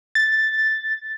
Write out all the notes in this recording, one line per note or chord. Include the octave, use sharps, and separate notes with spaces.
A6